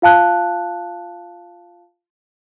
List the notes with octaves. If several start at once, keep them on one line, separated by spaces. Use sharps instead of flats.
F4 F5 A5 F#6